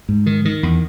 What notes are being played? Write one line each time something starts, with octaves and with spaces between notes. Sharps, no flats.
G#2
D#3
D#3
E2